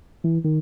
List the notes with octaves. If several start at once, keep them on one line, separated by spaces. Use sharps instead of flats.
E3
D#3